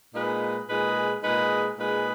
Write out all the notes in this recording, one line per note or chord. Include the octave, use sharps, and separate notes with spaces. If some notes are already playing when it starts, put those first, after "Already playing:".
A#2 G#3 D#4 G#4 B4
A#2 G#3 D#4 G#4 B4
A#2 G#3 D#4 G#4 B4
A#2 G#3 D#4 G#4 B4